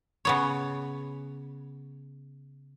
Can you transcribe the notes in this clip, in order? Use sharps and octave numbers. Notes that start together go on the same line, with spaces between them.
C#3 B3 C#5